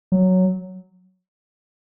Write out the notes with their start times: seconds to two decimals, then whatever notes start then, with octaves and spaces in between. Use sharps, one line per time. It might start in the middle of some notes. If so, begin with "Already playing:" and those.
0.12 F#3